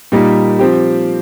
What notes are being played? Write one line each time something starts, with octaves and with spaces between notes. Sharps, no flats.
A#2 G3 A#3 D#4
F3 C4 G4